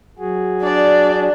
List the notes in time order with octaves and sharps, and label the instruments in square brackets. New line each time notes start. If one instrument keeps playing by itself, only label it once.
[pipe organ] F#3 F#4 G#4
[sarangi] D4 [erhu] D5